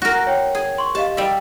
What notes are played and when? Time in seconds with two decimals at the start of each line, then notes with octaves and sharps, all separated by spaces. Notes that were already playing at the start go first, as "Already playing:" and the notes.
0.02 F#4 A#4
0.27 C#5 G5
0.55 G#4
0.78 C6 C#6
0.95 G4 D#5 F5 A5
1.17 G3 E5